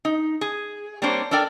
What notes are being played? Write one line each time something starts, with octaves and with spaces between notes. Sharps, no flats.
D#4
G#4
G3 A#3 C4 D4 C5 C#5
D4 A4 A#4 D5 G5